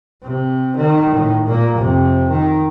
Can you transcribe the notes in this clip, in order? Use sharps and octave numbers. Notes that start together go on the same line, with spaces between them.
C3
D#3
A2 D#3
A#2 A#3
F2 C3
D#3